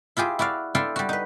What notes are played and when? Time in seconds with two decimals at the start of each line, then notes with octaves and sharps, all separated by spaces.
0.17 E4 F4 G4 G#4
0.39 E4 F#4 D5 F5
0.75 D4 E4 A4 F5 G5 C6
0.96 G3 F#4
1.09 D#4 B4